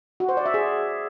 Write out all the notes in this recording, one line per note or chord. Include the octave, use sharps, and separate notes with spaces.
F#4
C5
D5
E5
G#4